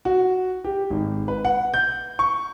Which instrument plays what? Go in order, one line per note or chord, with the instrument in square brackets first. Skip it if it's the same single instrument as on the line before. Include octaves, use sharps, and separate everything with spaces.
[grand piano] F#4
G4
G#1
B4
F#5
G6
C#6